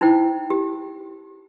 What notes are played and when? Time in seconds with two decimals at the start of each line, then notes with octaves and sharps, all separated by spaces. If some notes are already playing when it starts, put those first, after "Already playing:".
0.01 D#4 E4 C5 G5
0.50 G4